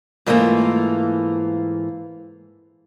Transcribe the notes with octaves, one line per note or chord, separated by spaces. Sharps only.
G#2 E3 A3 A#3 F4